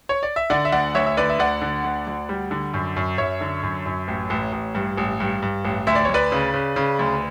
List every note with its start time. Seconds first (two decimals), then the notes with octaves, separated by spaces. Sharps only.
0.09 C#5
0.23 D5
0.36 E5
0.50 D3 D5 F#5
0.65 E5
0.72 D2 D5 F#5
0.95 D2 C#5 E5
1.06 E5
1.17 D3 B4 D5
1.29 E5
1.39 D2 D5 F#5
1.61 D3
1.84 D2
2.07 D2
2.29 G3
2.51 D3
2.74 F#2
2.96 F#2
3.18 F#2 C#5 E5
3.41 D3
3.63 F#2
3.86 F#2
4.08 A1
4.30 A1
4.52 A1
4.75 G2
4.97 A1
5.20 G2
5.42 G2
5.65 A1
5.87 D2 E5
5.95 D5
6.05 D2 C#5
6.14 B4 D5
6.32 C#3
6.54 C#3
6.76 C#3
6.99 D2